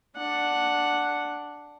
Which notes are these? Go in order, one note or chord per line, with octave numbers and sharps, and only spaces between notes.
D4 F#5